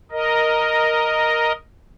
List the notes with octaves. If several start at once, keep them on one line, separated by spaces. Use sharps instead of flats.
A#4 D#5